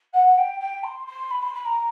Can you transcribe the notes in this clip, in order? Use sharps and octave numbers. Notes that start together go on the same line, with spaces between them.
F#5
F#5
G5
G5
C6
C6
B5
C6
B5
A#5